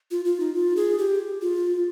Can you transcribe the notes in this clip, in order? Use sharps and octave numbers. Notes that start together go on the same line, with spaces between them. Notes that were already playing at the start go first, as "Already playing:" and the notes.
F4
F4
D#4
F4
G#4
G4
F4